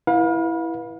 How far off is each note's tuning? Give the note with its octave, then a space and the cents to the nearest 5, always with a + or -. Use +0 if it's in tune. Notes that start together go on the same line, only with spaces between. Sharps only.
E4 +0 B4 -25 F5 +35